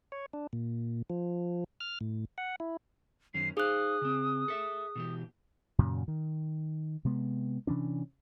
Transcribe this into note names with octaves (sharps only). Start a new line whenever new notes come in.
C#5
D4
A#2
F3
F6
A2
F#5
E4
F#2 D#3 C#4 C7
D#4 G#4 C5 F5 D#6 F#6
C#3 C4
A4 E5
B2 E3 G4
F#2 A#2 C#3 F#3
D#3
C3 G#3 B3
C3 E3 C#4 D4